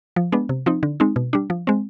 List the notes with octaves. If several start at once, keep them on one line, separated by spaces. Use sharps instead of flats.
F3
G#3 B3 D4
C3
F3 C4 D#4
D3
G#3 C4 D#4
B2
G3 D4
F3
G#3 C4